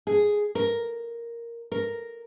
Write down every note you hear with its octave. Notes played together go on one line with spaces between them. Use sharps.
G#4
A#4
A#4